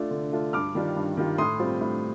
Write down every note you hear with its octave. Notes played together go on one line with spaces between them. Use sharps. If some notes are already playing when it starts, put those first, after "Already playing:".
Already playing: A3 D4 F4
D3
A3 D4 F4
G2 D6 F6
D#3 G3 D4 F4
G2
D#3 G3 D4 F4
A2 C6 D#6
G3 C4 F4
A2